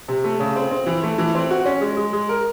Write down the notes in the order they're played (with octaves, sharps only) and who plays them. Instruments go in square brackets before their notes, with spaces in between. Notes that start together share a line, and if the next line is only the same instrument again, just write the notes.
[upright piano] C3
A3
C#3
C4
C4
E3
A3
E3
C4
F#4
C#4
G#3
G#3
G#3
A#4